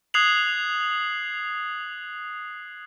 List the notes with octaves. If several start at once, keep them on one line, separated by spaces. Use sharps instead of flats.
D#6 F#6 G#6 C7 F7 F#7